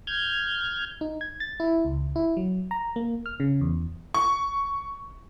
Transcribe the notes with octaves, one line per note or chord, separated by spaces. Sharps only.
F6 G6 G#6
D#4
G#6
A6
E4
C#2
E4
F#3
A#5
A#3
F6
C#3
E2
C#6